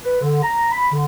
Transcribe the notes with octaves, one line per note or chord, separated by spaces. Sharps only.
B4
D3
A#5
B5
D3